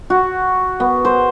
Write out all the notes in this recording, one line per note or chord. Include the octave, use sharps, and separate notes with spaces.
F#4
B3
C5